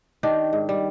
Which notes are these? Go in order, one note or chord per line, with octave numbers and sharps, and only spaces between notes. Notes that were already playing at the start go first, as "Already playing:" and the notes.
D#3 D4 G4
G#2
G3